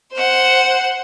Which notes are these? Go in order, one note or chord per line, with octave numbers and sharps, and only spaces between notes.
C5 F#5